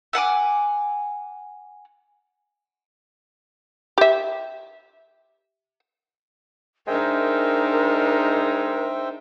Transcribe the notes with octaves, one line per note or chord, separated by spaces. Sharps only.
E5 F#5 G#5 D6
G4 E5
G#3 D4 D#4 A#4 C5 E5 G5